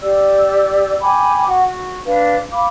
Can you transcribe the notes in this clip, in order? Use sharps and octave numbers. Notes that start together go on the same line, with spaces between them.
G4 D5 E6
G5 G#5 B5 D6
F#4 F#5
F#4
D4 B4 F5
F5 B5 D6